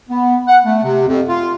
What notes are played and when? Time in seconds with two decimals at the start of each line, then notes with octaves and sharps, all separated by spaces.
0.09 B3
0.48 F#5
0.64 A3
0.84 C3
1.08 F2
1.29 F4